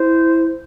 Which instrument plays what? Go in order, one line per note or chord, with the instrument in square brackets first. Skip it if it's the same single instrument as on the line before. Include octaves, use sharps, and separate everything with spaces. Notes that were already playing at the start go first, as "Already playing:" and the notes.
Already playing: [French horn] E4 [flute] C5